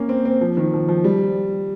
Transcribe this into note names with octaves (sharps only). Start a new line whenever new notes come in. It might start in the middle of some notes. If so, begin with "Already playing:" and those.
Already playing: A#3 C#4
C4
C4
F3
D#3
F3
F3
G3